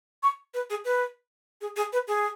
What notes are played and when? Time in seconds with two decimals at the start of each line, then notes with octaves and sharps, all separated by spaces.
0.23 C#6
0.54 B4
0.70 G#4
0.85 B4
1.61 G#4
1.76 G#4
1.93 B4
2.07 G#4